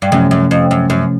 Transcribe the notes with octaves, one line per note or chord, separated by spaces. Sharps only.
G2
F#2 C3 F3 A3 C#4
F#2
F2
F#2
F#2